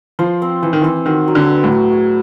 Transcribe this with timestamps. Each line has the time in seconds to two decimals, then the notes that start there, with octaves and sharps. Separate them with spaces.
0.19 F3 C5
0.42 C4
0.62 E3 C5
0.73 D#3
0.82 E3 C4
1.06 D#3 F#4
1.28 F#3
1.35 D3
1.50 B3
1.64 A2
1.72 F#3
1.92 G#4